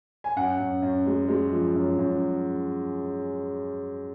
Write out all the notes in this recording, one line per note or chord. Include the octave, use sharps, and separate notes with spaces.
G#5
F#2 F#5
F#2
F#2
G#3
G#3
F3
F#2
F#2